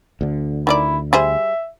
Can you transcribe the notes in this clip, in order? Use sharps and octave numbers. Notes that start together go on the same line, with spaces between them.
D2 D3
D#3 D4 E4 D5
G3 G#4 C5 E5